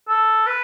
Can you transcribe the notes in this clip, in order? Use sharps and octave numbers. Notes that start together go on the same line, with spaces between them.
A4
B4